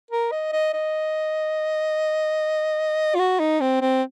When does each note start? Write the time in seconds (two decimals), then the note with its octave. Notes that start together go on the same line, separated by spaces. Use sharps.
0.11 A#4
0.32 D#5
0.52 D#5
0.73 D#5
3.15 F4
3.19 F#4
3.40 D#4
3.61 C4
3.81 C4